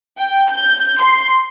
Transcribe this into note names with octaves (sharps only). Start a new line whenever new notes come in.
G5
G6
C6